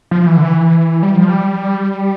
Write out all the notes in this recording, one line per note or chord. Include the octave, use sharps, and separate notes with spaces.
F3
E3
D3
E3
G3
F3
G3